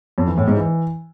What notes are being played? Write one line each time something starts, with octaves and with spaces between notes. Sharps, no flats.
F2
E3
A2
G#2
E3